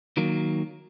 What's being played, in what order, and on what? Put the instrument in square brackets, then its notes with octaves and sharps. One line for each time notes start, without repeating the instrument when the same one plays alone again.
[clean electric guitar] D#3 F#3 A#3